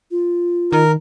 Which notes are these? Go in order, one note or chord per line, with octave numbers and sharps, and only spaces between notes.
F4
D#3 A#4